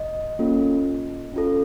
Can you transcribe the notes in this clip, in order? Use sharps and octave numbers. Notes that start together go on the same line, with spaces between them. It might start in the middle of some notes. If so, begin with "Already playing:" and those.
Already playing: D#5
A#3 C#4 F4 A4
C#4 F4 A4